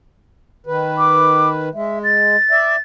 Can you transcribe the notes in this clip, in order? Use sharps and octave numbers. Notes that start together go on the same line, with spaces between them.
D#3 B4
D6
G#3 E5
A6
D5 E5